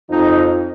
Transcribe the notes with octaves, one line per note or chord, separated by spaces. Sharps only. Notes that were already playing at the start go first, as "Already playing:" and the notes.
F2 F3 D#4